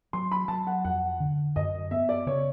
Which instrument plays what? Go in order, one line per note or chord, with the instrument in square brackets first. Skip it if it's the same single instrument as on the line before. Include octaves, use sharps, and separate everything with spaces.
[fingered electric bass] F#3 [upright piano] C6
[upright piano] B5
[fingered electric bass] F#3 [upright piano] A5
[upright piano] F#5
[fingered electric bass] F2 [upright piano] F#5
[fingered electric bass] D3
[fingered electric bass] F#2 [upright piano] D#5
[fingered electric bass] B3 [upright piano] E5
[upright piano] D5
[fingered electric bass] C#3 [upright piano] C#5